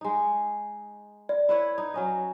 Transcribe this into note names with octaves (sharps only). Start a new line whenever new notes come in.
G#3 D#4
D5
E4 B4 C#5
D#4
F#3 C#4 D#5